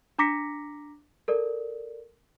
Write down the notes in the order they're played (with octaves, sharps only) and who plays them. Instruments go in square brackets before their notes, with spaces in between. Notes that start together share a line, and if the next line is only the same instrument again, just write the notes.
[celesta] D4 A#5 D6 A#6 B6 C#7
A4 A#4 D5